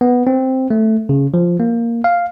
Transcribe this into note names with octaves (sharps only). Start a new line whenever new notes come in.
B3
C4
A3
C#3
F3
A#3
F5